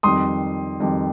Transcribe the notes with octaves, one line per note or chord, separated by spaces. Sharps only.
F2 D#3 G3 C6 D#6
F2 D#3 G3